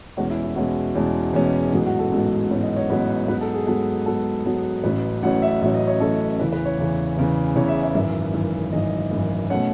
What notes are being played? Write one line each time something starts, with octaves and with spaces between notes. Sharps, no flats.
E2 B2 G#3 C#4 F#4
E4
E4
E2 B2 G#3 C#4 F#4
E2 B2 G#3 C#4
E2 B2 G#3 C#4
A1 G#2 F#3 B3 G#4
F#4
A4
A1 G#2 F#3 B3
A1 G#2 F#3 B3 C#5
D#5
C#5
A1 G#2 F#3 B3 B4
G#2 F#3 B3 B4
A4
G#4
G#2 F#3 B3 A4
G#2 F#3 B3 A4
G#2 F#3 B3
A1 A2 F#3 C#4 B4
A1 A2 F#3 C#4 F#5
E5
A1 A2 F#3 C#4 E5
D#5
C#5
A1 A2 F#3 C#4 A4
E2 C#3 E3 B4
B4
C#5
E2 C#3 E3
E2 C#3 E3
E2 C#3 E3 C#5
E5
E5
G#1 F#2 E3 E5
G#1 F#2 E3
G#1 F#2 E3 D#5
G#1 F#2 E3
B2 A3 C#4 F#5